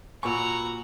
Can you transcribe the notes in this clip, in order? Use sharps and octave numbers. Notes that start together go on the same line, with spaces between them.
A#2 F#4 G#5 A#5 B5 C#6 E6